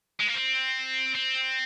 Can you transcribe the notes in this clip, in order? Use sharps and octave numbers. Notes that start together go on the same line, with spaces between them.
G#3
A#3
C4
C4